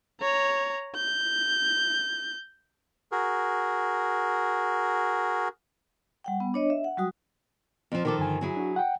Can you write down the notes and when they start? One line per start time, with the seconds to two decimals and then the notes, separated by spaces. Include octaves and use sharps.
0.21 C#5 A#5
0.96 G6
3.12 F#4 G#4 A#4
6.24 G3 F#5 G5
6.40 B3
6.54 D4 C#5 D#5
6.70 E5
6.84 F#5
6.97 F#3 G3 F#4 D#6
7.92 F2 F3
8.05 D#3 F3 A4 A#4 D6
8.19 G2 D3 G#5
8.41 F#3 E4 G#4
8.57 D4 F#4
8.76 F#5 G5